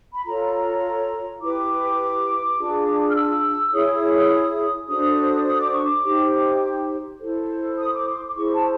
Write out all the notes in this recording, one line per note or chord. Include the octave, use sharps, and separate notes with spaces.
B5
F4 A4 C#5 A#5
E4 G4 B4 D6
D4 F4 G#4
F6
E6
E4 G#4 C#5 D#6
D4 F#4 A4 C5 D#6
D#6
D6
C#6
D6
D#4 G4 C5
E4 A4 C5
D#6
D6
C6
D6
E4 G#4 C5 C#6
A5